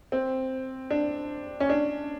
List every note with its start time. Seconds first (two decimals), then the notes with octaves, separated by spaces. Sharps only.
0.12 C4
0.90 D4
1.60 C#4
1.69 D4